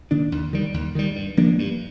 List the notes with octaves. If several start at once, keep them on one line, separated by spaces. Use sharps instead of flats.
D#3 A#3 D4
D#2
D#3 G3
D#2
D#3 G3
G2
F3 A#3 D4
G2